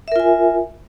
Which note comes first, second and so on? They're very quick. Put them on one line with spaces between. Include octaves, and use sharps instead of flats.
E5 A#4 F4 G#5